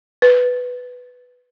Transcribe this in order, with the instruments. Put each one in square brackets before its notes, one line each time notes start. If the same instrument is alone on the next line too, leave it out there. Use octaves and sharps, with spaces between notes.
[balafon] B4